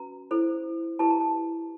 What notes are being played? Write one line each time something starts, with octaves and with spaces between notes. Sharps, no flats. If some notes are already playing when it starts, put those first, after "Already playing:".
Already playing: C#4 F#4 B4 A#5
E4 A4 C5
E4 G4 B4 A5
A#5
A5